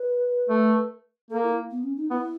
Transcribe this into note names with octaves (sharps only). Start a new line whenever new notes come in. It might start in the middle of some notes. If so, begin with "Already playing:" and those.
Already playing: B4
A3
A#3 A4
E4
B3
C#4
D#4
B3 E4